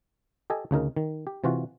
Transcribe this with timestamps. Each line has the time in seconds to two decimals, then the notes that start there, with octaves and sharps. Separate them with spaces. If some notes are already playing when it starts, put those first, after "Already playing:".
0.50 G4 A4 D#5 G#5
0.71 D2 C#3 D#4 A#4
0.96 D#3
1.27 G4
1.44 C3 E3 F4 F#4